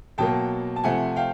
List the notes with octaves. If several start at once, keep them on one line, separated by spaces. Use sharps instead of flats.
B2 F#3 A#3 G5 A5
A5
C3 F3 A3 F#5 G#5
F5 G5